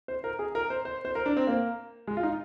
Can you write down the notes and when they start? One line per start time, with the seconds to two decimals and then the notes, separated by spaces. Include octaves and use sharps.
0.08 C5
0.24 A#4
0.39 G#4
0.55 A#4
0.70 C5
0.85 C5
1.05 C5
1.15 A#4
1.26 D4
1.37 C4
1.47 A#3
2.07 G#3
2.17 F4
2.23 D#4